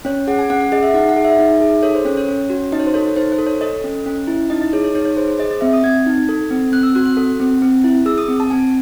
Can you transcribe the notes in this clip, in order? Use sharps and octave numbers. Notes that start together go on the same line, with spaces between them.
C#4 C#5
G#4 F#5
G#5
C#4 F#5
F#5
G#4 D#5
E5
D#4 F#5
F#5
G#4
E5
D#4
G#4
A4 C#5
C5
C#4 C#5
C#5
C#4
F#4
D#4 D#5
C#5
C5
A4 C#5
D#4 C5
C5
A4
C#5
A4 D#5
C#4
C#4
E4
D#4 D#5
D#5
G#4 C#5
C#5
D#4 C#5
C#5
G#4 C5
C5
G#4 D#5
D#5
C4 E5
D#6
C4 G#6
D#4
A4
C4
C4 F#6
E6
F#4 F#6
F#6
A4
C4
C4
E4
G#4 E6
D#6
C4
A5
C4 G#5